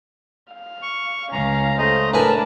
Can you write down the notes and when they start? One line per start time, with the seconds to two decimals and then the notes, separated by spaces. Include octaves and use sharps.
0.53 F5
0.83 C#6
1.32 C#2 C#4 F5 A#5
1.78 A3 C5 D#5 A#5
2.14 A2 D4 A#4 B4 G#5 A5 B5